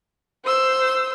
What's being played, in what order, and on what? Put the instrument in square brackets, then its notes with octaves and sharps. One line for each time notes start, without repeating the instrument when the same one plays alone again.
[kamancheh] C5 E6